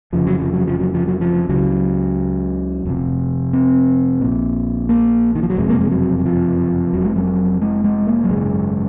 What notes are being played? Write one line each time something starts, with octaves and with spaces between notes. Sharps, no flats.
F1 F2 C#3 F3
F#3
F3
F#3
F3
F#3
F3
F#3
F3
C#2 C#3 F#3
F1 F2 C3
C4
A#1 A#2
A#3
D#3
F3
F#3
F#1 F2 C3 G#3
A#3
G#3
F#3
F#3
F3
F1 F2 C3 F#3
G#3
F#3
G#3
G#3
A#3
F#3
G#1 F#2 C#3 G#3